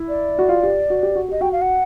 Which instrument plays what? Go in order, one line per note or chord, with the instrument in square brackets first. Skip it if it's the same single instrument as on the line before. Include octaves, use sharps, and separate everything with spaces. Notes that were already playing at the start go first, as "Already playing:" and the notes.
Already playing: [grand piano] E4
[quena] D5
[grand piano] F#4
F4
G4
F#4
G4
F#4
[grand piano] G4 [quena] D#5
[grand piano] F#4 [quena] G5
[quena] F5
F#5